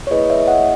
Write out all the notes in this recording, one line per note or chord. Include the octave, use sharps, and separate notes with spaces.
C#5
A#3 E4 G#4 B4 D#5
C#5 E5
D#5 F#5